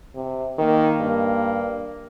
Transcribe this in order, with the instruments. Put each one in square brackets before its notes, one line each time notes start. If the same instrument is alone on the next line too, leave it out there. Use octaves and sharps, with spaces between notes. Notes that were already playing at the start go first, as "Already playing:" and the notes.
[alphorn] C3
[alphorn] D#3 [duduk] A#3
[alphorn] G2